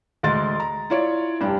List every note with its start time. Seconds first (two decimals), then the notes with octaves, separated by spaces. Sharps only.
0.23 D2 G#3 D#5 C6 A6
0.60 A#5
0.90 E4 F4 C#5 D5
1.40 F1 G2 D4 G5